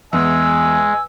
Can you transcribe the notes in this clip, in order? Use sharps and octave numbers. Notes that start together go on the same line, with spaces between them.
E2 G#3 G#5 E6